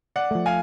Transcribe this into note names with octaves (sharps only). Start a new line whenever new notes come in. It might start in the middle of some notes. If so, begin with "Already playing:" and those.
D5 F#5
F3 A3
F5 G#5